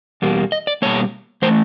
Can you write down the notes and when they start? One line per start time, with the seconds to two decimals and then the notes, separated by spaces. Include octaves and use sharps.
0.22 E2 B2 G3 A#3
0.52 D#5
0.67 D5
0.82 B2 G3 A#3 C#5
1.42 E3 A3 C5